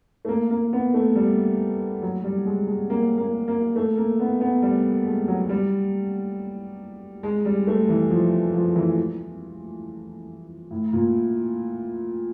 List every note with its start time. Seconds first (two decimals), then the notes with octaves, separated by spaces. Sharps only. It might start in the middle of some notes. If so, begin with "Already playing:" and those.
0.25 A3
0.29 A#3
0.51 A#3
0.73 B3
0.94 A3
1.15 G3
2.02 F#3
2.24 G3
2.46 G#3
2.67 G#3
2.90 A#3
3.18 A#3
3.48 A#3
3.76 A3
3.97 A#3
4.20 B3
4.41 B3
4.62 G3
5.06 G#3
5.28 F#3
5.49 G3
7.23 G#3
7.45 G3
7.67 A3
7.89 E3
8.10 F3
8.54 F3
8.76 E3
10.71 A2
10.93 A#2